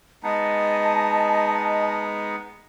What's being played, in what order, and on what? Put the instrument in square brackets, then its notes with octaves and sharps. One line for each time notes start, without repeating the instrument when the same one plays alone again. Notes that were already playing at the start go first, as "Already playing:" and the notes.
[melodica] G#3 B3 D#4 [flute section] D#5 G#5 A5